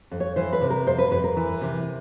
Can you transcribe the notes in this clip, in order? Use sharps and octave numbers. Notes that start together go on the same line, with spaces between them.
F2
C#5
E3 C5
B4
C3
A#4
F2 C5
B4
F2 B4
A#4
E3
C3